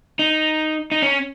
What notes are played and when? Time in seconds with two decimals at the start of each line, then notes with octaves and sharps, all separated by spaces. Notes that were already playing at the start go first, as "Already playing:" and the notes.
0.19 D#4
0.92 D#4
1.02 C#4